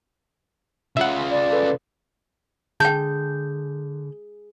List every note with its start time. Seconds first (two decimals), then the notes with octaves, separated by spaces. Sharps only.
0.97 C#3 F4 E5 F#5
1.31 D5
1.52 A4 B4
2.80 D3 G#4 G5 A5 G6